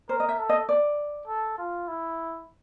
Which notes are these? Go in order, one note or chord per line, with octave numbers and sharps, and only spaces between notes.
A#4 C5
D#5
E5
A4
D#5
D5
A4
F4
E4